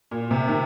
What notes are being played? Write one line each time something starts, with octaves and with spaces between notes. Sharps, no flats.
A#2
C3
D#3